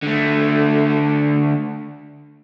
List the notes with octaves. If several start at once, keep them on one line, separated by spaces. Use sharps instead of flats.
D3 A3